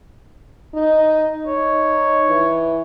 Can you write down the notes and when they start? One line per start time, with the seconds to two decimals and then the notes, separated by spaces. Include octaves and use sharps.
0.74 D#4
1.46 D#4 C#5
2.29 E3